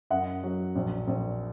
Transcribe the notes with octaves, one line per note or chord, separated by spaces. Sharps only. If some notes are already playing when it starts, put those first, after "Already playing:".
F#2 D#5 F#5
F#3
A#1
A#1